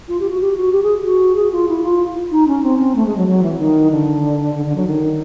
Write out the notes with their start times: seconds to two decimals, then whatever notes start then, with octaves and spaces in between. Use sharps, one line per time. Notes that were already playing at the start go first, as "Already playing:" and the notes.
0.08 F4
0.20 G4
0.30 F#4
0.41 G4
0.57 F#4
0.72 G4
0.83 G#4
1.04 F#4
1.36 G#4
1.52 F4
1.68 E4
1.83 F4
2.31 D#4
2.47 C#4
2.63 C4
2.79 C4
2.95 A3
3.06 G#3
3.17 F#3
3.27 F#3
3.43 E3
3.59 D#3
3.91 D3
4.54 D3
4.66 D3
4.76 F#3
4.87 D#3